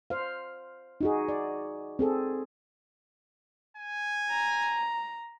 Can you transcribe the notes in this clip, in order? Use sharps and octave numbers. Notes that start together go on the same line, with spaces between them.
C5 F5
D#4 F#4 G#4
D5
C4 G#4 A4
G#5
A#5